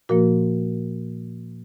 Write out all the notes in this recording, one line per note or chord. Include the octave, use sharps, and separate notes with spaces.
A#2 F3 A#3 F#4 A#4